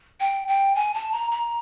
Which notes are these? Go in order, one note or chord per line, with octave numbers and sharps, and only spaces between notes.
G5
G5
G#5
A5
A#5
A#5